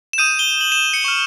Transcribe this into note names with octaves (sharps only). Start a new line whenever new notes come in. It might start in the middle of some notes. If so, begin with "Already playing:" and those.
E7
D#6 G6 D#7
G7
F#7
E7
C#7
C#6 F6